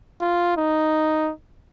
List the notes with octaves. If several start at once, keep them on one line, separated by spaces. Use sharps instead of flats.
F4
D#4